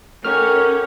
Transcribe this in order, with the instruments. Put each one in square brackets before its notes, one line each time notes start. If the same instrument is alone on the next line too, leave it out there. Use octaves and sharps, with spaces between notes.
[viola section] C#4 C#5 [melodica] D#4 F#4 G4 [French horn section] A4 A#4 [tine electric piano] F6